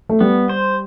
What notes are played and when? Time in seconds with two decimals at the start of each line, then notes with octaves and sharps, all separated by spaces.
0.09 A3
0.21 G3 B3
0.49 C5